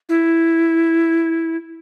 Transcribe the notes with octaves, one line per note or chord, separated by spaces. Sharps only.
E4